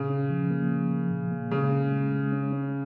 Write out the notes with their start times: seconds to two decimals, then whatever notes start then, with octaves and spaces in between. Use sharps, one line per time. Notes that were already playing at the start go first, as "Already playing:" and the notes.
Already playing: A#2 C#3
0.10 C#4
0.30 F3
0.51 A#3
0.70 F3
0.91 F3
1.11 A#2
1.32 A#3
1.51 C#3 G#3
1.72 C#4
1.92 G#3
2.12 G#3
2.32 C#4
2.53 C#4